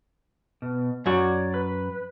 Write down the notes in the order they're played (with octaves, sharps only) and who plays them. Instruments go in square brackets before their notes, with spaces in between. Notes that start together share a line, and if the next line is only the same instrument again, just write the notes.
[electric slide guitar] B2
[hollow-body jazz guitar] F#2 F#4 [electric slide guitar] C#5 D5
[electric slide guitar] B4